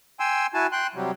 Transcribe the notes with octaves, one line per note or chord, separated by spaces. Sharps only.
G5 G#5 C6 E6
E4 F#4 G#5 A5
G5 C6 F#6
C3 F#3 G3